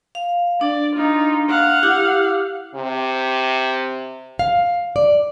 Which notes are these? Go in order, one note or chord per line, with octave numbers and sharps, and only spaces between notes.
F5
D4 D5
D#4 F4
F5 F#5
E4 G4 D6
C3
F5
D5